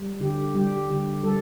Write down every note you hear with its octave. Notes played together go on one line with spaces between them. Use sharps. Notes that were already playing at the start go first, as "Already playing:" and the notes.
Already playing: G3
D3 G4
G3 G4
D3 G4
G3 A4